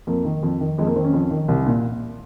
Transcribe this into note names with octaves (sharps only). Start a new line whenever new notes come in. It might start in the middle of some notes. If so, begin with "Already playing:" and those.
F2 A#3
D#3
F2
D#3
F2 G#3
A#3
D#3 C4
C#4
F2
D#3
C2
A#2